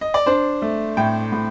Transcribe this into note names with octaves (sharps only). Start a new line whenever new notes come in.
D#5
D5
D4 C5
A3
A2 G5
A2